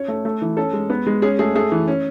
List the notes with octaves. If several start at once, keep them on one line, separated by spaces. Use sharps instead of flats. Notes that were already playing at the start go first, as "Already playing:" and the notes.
Already playing: C#4 C#5
A3
A3
E3
C#4 A4
G#3
B3
G#3
C#4 G#4
A3 G#4
A3 G#4
E3
C#4